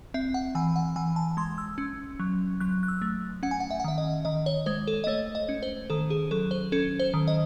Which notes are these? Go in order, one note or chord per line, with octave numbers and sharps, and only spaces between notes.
C4 E5
F#5
E3 G#5
F#5
E3 G#5
A5
G#3 C6
E6
C#4
F#3
F#3 F#6
F#6
E6
A3
C#4 F#5
G#5
F#5
E5
F#5
D#3 E5
D#5
D#3 D#5
C#5
G#3 C5
A4
D#5
A3 C#5
D#5
C#4
C5
D#3 A4
G#4
F#3 A4
C5
C#4 A4
C5
D#3
D#5